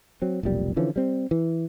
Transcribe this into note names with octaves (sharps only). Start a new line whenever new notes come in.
F#3 C4
F1 B1 A#2 G3
D3 E3 F3 C#4
G3 C4
E3